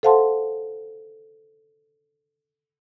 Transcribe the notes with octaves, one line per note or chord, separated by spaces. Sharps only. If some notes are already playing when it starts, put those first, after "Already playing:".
A4 C5 F5 F#5 A5 C6